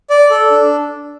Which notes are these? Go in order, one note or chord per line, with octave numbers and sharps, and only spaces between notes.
D5
A4
D4